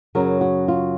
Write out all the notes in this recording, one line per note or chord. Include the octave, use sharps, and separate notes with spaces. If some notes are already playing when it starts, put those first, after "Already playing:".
F#2 C#3 F#3 A#4
F#4
F4